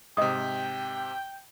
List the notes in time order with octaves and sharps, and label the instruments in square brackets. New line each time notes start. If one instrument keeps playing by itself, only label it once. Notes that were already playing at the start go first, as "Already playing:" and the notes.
[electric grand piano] G#2 C3 [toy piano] D#5 D#6 [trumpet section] G5